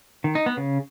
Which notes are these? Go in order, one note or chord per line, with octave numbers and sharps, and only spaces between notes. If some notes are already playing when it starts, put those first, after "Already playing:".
D#3
D#4
B3
C#3